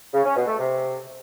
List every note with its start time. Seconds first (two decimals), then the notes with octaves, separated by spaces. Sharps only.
0.14 C#3
0.25 C#4
0.36 B2
0.47 A3
0.58 C3